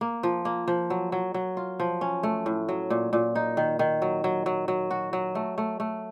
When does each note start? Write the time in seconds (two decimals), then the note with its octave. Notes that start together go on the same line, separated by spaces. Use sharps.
0.01 A#3
0.23 F3
0.45 A#3
0.68 F3
0.90 F#3
1.12 F#3
1.34 F#3
1.57 F4
1.80 F3
2.01 C#4
2.23 A3
2.46 A2
2.69 F#3
2.90 A#2
3.13 A#2
3.35 D#4
3.57 D#3
3.79 D#3
4.02 F#3
4.24 F#3
4.46 F#3
4.68 F#3
4.91 F#4
5.13 F#3
5.35 A3
5.58 A3
5.80 A3